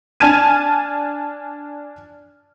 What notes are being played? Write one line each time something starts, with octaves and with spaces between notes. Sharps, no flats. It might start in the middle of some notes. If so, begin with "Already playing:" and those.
D4 G#5 A5 F6 G#6 D#7